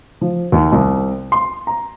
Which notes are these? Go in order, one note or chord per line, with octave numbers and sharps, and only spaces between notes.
F3
D#2
C2
C6
A#5